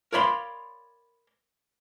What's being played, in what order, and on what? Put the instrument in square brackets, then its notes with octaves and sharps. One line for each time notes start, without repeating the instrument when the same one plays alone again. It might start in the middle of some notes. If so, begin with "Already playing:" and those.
[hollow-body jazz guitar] A#4 C#5 D5 F5 B5 C6